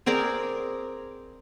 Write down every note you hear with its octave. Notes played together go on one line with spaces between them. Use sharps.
C4 G#4 A#4 D5